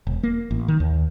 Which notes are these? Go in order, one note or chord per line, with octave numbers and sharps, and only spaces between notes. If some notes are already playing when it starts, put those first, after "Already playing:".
E1
A#3
A1
D#3
D#2